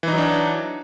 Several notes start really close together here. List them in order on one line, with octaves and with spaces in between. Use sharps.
E3 D#4 F#3 D4